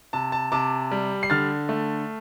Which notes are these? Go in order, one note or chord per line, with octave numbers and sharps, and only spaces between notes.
C3 A5
A5
C3 A5 D6
G3
C7
D3 F6 A6
A3